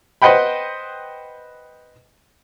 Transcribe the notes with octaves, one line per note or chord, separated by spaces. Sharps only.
B4 C5 D#5 F#5 G5 B5